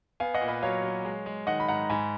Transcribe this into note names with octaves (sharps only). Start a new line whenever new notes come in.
B3 F5 G#5
D#5 F#5
A#2
B4 D#5
F#3 C#5 F5
F#3
G#3
G#3
D#3 D#5 F#5
B5
G#2 F#5 A#5
G#2 G#5 B5